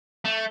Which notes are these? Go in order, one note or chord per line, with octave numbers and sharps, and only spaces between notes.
A3